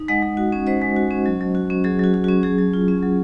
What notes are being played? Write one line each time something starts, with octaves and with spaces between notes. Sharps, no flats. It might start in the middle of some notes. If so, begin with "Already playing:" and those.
Already playing: D#4
G#3 D#5 F#5
G#3
F#4
C#4
G#3 C5 D#5
G#3
F#4
C#4
F#3
F#3
F#4
C#4
F#3 G#4
F#3 F#4
F#4
C#4 F#4
F#3 G#4
F#3
F4
C#4
F#3